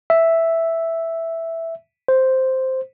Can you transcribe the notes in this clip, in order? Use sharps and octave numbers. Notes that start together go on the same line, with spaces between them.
E5
C5